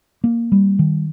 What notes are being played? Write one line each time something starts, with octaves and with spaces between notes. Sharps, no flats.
A#3
G3
D#3